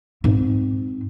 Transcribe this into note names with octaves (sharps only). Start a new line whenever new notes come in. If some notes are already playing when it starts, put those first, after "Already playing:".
G#2 C4